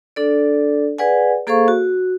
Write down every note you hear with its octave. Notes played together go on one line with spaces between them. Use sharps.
D4 A4 D5
G#4 B4 D5 F#5 G#5
A#3 G#4 A4 C5 F5 C#6
F#4